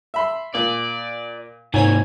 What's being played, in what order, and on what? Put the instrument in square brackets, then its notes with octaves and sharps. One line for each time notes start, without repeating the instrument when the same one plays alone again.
[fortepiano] E5 B5 C6
[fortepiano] A#2 [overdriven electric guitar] D5
[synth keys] G#2 C#5 G#6 [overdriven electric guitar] C3 A#3 [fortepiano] G#5